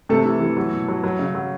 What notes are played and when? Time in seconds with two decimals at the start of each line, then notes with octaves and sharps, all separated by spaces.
0.09 C3 A3 A4
0.25 E3
0.41 E3
0.57 F#3
0.73 B2
0.89 F#3
1.04 F#3
1.19 C#3
1.35 F#3